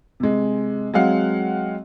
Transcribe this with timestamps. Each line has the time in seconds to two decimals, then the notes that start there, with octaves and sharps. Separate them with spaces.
0.20 C3 G#3
0.94 F#3 G#3 C4 F5 F#5